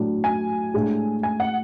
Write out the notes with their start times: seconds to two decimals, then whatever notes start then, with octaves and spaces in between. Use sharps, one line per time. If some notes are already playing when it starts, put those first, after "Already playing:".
Already playing: A2 F#3 A3 D4
0.24 G#5
0.74 A2 G#3 D4
1.23 G#5
1.40 F#5